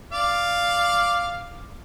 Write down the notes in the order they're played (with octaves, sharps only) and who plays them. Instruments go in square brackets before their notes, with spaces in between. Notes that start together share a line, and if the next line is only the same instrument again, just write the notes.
[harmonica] D5 F5